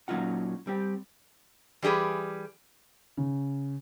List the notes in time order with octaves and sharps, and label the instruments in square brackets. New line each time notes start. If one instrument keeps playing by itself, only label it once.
[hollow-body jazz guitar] A#2 F#3 C#4 D#4 F4 F#5
G3 C4 G4
[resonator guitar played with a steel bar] E3 G3 G4 G#4 B4
[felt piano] C#3